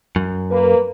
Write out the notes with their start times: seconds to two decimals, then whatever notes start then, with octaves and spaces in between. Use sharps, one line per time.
0.16 F#2
0.50 A#3 B4